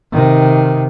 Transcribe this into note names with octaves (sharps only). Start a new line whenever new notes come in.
C3 D#3